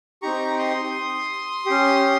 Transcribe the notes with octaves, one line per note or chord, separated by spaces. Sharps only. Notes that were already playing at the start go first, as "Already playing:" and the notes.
C4 D#4 G4 A#5 C#6
C6 D#6
C#4 G4